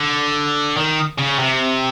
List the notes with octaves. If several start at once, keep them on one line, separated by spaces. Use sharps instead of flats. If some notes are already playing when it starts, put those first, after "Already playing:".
Already playing: D3
D#3
C#3
C3